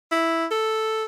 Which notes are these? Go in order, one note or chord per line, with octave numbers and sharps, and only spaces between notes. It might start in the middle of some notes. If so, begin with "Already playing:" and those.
E4
A4